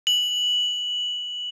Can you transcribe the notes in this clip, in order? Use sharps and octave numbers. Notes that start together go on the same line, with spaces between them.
F#7